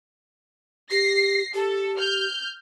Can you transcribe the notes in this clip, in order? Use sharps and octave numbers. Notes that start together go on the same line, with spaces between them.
G4 A#6 C7
G4 A4
F6 G6